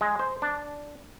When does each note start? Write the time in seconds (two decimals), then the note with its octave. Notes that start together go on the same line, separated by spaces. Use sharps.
0.01 G#3
0.19 C5
0.42 D4